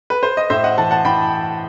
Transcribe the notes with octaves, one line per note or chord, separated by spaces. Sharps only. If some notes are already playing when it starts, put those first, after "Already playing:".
B4
C5
D#5
A2 C5 E5
D#5 F#5
E3 F#5 A5
F#5 A5
E3 G5 B5